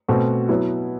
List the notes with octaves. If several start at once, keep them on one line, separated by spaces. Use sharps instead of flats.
B2 A3 C4 F#4
F#3 B3 E4